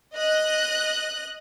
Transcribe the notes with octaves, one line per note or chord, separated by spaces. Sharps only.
D#5 F#6